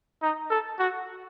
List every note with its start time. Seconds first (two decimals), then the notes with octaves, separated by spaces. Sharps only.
0.22 D#4
0.50 A4
0.79 F#4